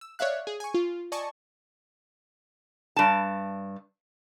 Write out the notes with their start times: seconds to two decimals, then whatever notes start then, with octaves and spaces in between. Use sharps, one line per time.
0.01 E6
0.19 C#5 D5 E5 F5 F#6
0.47 G#4
0.60 G#5 C#6
0.74 F4
1.12 D5 D#5 G#5 A5 C#6
2.96 G2 A5